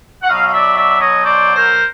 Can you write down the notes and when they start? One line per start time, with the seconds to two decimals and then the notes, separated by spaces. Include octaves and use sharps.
0.22 F#5
0.29 B2 F#3 D#5 F5
0.48 F5
0.53 D5 E5
0.77 D5 E5
1.01 C#5 D#5
1.23 C5 D5
1.56 A#4 C5